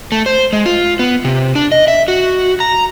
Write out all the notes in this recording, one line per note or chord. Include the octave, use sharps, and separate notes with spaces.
A3
C5
G#3
F4
B3
C3
D4
D#5
E5
F#4
A#5